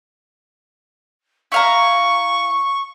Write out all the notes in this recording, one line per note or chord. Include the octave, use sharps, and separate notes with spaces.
E4 F5 A#5 C#6